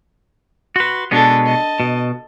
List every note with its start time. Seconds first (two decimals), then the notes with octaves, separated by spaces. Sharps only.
0.76 F#4 B4 C6
1.11 B2 G#3 B3 D4 A4
1.45 D#5 A5
1.80 B2